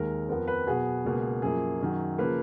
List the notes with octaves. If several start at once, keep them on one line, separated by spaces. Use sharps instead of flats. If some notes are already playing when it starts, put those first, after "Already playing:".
Already playing: D#2 D#3 G#3 A#4
F2 F3 B3 A#4
B4
B2 F#3 B3 G#4
C#2 B2 A#3
F#2 F3 A#3 G#4
F#2 D#3 F#3
C#3 F3 A#3 B4